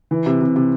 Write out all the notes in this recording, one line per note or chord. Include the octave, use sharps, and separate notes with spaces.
E3
C3
C3
C3